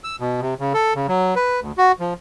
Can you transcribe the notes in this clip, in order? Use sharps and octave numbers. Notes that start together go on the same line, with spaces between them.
E6
B2
C3
C#3
A4
C#3
F#3
B4
D2
F#4
F3